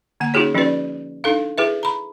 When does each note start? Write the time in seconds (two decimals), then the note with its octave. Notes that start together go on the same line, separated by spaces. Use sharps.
0.20 D3 A#3 F#5
0.34 C#4 D#4 F4 F#4 G#4 C#5
0.55 F3 C#4 D#4 F#4 B4 D5
1.24 D4 D#4 A4 F5
1.58 E4 G#4 B4 E5
1.83 A#5 B5